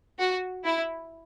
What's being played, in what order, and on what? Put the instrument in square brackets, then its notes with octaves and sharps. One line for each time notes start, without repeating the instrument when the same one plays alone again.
[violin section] F#4
E4